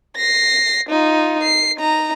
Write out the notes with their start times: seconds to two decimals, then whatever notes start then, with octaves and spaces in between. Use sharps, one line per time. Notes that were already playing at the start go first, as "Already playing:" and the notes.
0.17 A#6 C7
0.89 D#4 F4
1.43 C7
1.77 D#4 A#5